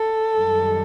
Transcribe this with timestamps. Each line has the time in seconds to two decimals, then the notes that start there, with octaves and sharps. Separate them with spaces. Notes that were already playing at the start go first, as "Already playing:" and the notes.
Already playing: A4
0.37 F#2 D#3 G3